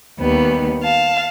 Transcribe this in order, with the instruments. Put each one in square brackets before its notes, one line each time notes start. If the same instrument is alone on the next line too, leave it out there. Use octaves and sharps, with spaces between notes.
[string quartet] D#2 G3 B3
F5 A5